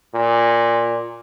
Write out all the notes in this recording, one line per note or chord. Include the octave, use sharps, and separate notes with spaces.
A#2